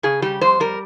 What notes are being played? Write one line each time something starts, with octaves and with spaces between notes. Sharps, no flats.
C#3 G#4
G3 G4
F2 C5
G3 A#4